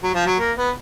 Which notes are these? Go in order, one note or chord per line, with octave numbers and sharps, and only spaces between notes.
F#3
F3
F#3
A#3
B3